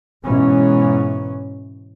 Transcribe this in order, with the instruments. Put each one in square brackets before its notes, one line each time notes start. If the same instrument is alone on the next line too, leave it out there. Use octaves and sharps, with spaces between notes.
[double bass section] G#2 B2 E3 C#4